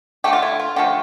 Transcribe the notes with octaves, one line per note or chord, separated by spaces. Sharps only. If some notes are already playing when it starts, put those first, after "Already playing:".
D3 A3 G4
F4
E4
F4
D3 F3 A3 G4